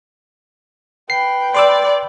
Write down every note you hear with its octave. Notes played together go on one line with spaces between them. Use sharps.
B4 G5 C7
D5 C6 D6 E6